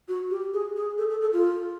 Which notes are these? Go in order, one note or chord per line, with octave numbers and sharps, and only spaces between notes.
F#4
G4
G#4
G#4
A4
A4
A4
F4